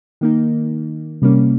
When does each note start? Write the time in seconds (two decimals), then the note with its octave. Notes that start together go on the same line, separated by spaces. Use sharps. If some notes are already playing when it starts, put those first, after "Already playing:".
0.21 D#3 A#3 D#4
1.22 C3 G3 A#3 C#4